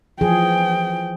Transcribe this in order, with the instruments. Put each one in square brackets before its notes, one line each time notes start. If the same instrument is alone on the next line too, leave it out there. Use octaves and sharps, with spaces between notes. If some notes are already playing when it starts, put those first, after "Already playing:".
[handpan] E3 F3 G#4 [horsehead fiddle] G5